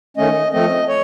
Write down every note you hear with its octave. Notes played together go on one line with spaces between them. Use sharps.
D#3 A3 C#4 D#5
F3 A3 C4 D#5
C#5